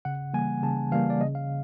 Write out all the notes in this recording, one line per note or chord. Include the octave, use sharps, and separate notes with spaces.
C#3 F#5
E3 G3 A#3 G#5
C#3 A5
E3 G3 A#3 F5
D5
C#3 D#5
F5